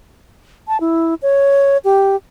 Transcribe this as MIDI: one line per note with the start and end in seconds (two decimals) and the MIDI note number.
0.68 0.80 81
0.80 1.14 64
1.22 1.77 73
1.84 2.16 67